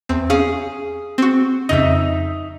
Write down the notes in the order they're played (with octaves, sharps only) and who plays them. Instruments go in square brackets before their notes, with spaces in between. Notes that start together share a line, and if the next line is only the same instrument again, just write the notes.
[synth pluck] E2 C4
[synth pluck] C#4 F5 [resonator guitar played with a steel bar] G#4
[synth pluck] C4 F#4
[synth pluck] F2 C#3 D#5 [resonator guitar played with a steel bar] D#4 E5